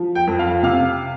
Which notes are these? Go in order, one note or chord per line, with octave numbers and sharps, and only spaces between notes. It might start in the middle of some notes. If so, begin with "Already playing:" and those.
Already playing: F3
G5
F2
F5
C3 F5